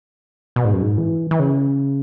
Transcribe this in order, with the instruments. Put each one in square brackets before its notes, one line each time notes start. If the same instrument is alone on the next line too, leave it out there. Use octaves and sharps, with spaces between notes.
[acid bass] B2
G#2
F#2
G#2
E3
E3
C#3